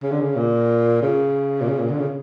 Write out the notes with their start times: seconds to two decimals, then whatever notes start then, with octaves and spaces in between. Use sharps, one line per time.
0.03 C#3
0.12 D3
0.21 C#3
0.36 A#2
1.02 C#3
1.62 A#2
1.68 C#3
1.79 A#2
1.90 D3
1.99 C#3